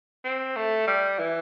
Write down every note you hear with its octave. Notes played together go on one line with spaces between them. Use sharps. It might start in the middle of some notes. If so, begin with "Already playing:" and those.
C4
A3
G3
E3